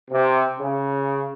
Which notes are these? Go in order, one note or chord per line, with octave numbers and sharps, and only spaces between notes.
C3
C#3